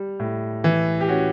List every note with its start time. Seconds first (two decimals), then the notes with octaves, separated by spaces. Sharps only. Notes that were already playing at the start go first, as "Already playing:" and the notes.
Already playing: G3
0.20 A2
0.64 E3
1.01 G4
1.09 C#4 F#4